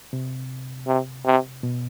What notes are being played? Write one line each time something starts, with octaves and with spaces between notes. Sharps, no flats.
C3
C3
C3
B2